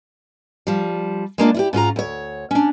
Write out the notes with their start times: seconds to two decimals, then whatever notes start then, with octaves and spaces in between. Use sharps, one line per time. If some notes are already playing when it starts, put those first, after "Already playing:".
0.67 F3 G3
1.38 G#3 A#3 D4 F4
1.54 E4 F4 G4
1.73 G#2 C#4 F4 A#5
1.96 D2 C#5
2.51 C#4 D4